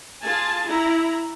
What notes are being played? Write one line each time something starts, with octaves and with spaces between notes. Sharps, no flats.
F4 G#4 G#5 A5
E4 A#5